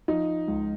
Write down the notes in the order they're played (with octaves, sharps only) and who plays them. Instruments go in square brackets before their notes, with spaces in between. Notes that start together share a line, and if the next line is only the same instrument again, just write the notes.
[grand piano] F3 D#4
C#2